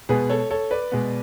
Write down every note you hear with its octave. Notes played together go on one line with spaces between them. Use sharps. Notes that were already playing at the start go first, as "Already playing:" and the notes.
B2 G#3 B3 G#4 B4
A4 C#5
A4 C#5
B4 D5
B2 G#3 B3